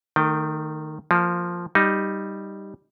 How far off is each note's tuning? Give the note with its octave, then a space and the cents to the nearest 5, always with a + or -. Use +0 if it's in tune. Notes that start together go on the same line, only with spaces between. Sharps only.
D#3 -10 A3 +25 G5 +0
F3 +0 A#3 -15
G3 +0 D#4 +0